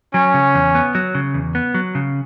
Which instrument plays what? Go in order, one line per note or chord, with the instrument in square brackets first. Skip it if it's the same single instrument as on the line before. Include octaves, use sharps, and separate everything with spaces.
[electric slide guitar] F#3 [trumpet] C#4
[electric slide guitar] C#3
E2
B3
F#3
C#3
E2
B3
F#3
C#3